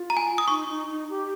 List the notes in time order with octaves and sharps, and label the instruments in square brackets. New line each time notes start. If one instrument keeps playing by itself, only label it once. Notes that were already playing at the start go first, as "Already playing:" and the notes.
Already playing: [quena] F4
[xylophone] A#5
G#5
D#6
[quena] D#4 [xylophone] C#6
[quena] D#4
D#4
G4